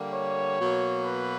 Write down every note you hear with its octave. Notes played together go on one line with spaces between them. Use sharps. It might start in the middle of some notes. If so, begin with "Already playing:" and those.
Already playing: D3 G3 A#3
C#5
B2 F#3 A#3
B4